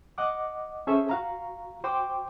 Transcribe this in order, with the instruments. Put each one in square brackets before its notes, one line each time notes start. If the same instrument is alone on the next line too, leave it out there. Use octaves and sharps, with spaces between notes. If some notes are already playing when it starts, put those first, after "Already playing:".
[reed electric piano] D#5 F#5 D6
C#4 G#4 A4 C5 C#5 E5
F#4 F5 A#5
F#4 C5 G5 C6 D6